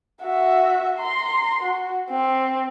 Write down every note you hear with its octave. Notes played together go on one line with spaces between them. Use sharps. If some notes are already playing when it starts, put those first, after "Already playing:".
F#4 E5
A#5 C6
F#4
C4